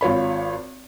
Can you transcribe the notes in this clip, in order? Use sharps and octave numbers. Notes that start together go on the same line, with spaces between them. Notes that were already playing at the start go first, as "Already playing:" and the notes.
G#1 F4 C#5 B5